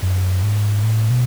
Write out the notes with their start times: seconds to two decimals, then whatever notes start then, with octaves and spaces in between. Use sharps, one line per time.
0.02 F#2
0.43 G#2
0.83 A2
1.10 B2